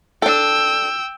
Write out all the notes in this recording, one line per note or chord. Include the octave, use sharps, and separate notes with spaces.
D4 A4 G5 E6